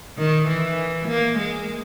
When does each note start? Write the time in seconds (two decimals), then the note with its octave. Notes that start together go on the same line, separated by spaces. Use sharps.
0.17 D#3
0.47 E3
1.08 A#3
1.38 G#3